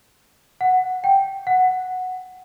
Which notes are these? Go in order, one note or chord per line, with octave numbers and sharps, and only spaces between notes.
F#5
G5
F#5